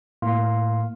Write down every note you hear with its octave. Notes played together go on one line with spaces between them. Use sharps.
A2 A#3 F5 C6